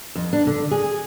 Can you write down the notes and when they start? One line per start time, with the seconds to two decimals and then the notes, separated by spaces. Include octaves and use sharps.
0.15 F2
0.33 D4
0.47 D3
0.71 G#4